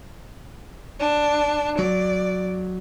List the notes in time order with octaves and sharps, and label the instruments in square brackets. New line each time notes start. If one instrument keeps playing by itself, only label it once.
[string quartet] D4
[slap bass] F#3 [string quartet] D5